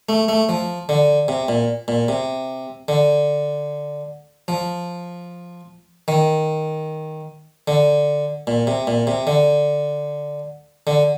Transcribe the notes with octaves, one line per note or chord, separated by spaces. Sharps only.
A3
A3
F3
D3
C3
A#2
A#2
C3
D3
F3
D#3
D3
A#2
C3
A#2
C3
D3
D3